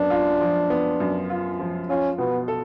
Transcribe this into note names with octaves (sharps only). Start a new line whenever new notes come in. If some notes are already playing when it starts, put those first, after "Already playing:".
Already playing: F#2 B3 D4
F4
F3
B3
F#2
F4
F3
C#4 F4
B2 B3
A4